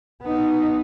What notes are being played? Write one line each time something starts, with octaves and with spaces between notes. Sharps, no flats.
B3 D#4